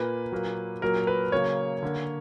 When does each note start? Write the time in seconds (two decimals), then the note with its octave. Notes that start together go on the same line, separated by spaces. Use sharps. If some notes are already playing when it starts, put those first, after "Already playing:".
Already playing: A#2 A#3 B4
0.32 A#2 F#3 A#3
0.82 A#2 F#3 A#3 A#4
1.07 B4
1.32 C#3 F#3 A#3 C#5
1.83 D3 A#3